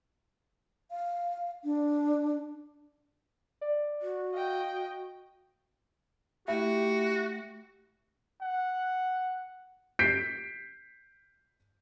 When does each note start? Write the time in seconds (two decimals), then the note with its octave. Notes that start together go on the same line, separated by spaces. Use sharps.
0.91 F5
1.64 D4
3.61 D5
4.02 F#4
4.33 D#5 F5 G5
6.48 A3 E4 F#4 G4
8.42 F#5
9.99 G6 B6 C7 D7